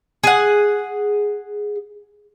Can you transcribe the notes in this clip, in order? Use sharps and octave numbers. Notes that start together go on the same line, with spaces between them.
G#4 F#5